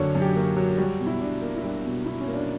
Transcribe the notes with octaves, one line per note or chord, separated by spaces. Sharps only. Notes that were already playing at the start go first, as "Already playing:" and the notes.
Already playing: F#2 D3 F#3 A#3 C#5
F#2
G4
A#3
F#3
G3 F#4
B2
E4
B2 D4
A#3
E4
G3 D4
B2
B2 E4
C#4
A#3
D4